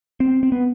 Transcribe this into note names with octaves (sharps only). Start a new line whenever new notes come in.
C4
C4
B3